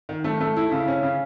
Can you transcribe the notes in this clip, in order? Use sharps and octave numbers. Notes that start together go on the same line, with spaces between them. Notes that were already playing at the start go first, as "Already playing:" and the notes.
D#3
A3
A3
E4
C#3
C#4
C#3